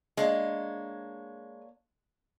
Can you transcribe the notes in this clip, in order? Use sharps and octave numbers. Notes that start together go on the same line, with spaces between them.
G#3 A#3 D4 C#5